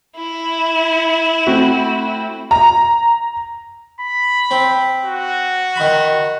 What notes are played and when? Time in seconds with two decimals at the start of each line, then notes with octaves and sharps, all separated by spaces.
0.16 E4
1.47 A3 C4 F#4
2.51 A#5
4.01 B5
4.51 C4
5.05 F#4
5.76 D#3 B5